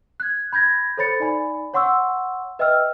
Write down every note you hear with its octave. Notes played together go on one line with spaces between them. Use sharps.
F#6 G#6
B5 G6 G#6 A#6
A4 C5 C#5 B5 A6 C#7
D#4 D5 G#5 B5
C#5 F#5 C6 C#6 E6
B4 D#5 E5 G5 E6 F6